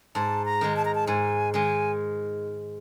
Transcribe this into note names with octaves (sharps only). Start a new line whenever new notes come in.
G#2 A5
A#5
D#3 G#3
A5
A#5
A5
G#2 G#5
D#3 G#3 G#5